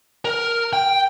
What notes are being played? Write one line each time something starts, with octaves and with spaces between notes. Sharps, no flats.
A#4
G5